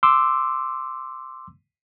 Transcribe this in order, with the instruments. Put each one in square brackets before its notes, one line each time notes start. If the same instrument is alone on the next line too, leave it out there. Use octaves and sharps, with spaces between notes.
[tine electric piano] C6 D6 E6